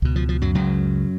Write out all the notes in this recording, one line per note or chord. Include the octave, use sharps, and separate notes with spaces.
C#2 B2
F3
F3
F#2 F#3
C#2 F#2 C#3 F#3